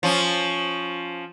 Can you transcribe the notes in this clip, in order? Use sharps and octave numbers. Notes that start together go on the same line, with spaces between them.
F3 C#4